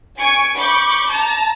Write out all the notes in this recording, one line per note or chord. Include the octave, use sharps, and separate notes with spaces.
G#5 C#6 G#6 D7
B5 C#6 D6 G6
A5 A#5